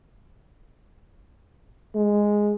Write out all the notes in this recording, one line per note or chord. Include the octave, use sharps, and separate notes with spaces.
G#3